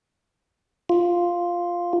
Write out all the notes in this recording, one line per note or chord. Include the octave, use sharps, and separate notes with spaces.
F4